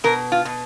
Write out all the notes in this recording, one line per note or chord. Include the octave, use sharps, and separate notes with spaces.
B2 A#4
F4
B2